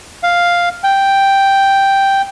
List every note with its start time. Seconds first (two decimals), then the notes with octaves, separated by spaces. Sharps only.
0.23 F5
0.84 G5